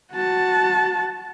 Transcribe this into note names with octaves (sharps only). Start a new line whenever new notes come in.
F#4 A5